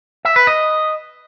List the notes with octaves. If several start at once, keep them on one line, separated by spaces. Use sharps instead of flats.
E5
B4
D#5